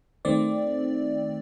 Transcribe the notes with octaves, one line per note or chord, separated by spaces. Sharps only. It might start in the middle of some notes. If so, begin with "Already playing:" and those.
D#3 A3 C4 D5